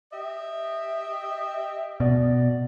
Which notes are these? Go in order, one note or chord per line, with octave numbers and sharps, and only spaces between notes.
G4 D#5 E5
B2 D5